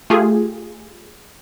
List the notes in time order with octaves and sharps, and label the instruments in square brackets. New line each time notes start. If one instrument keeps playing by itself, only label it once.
[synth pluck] A3 F4 G4 G#4